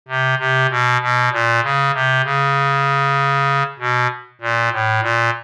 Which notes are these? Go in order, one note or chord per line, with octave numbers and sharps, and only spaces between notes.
C3
C3
B2
B2
A#2
C#3
C3
C#3
B2
A#2
A2
A#2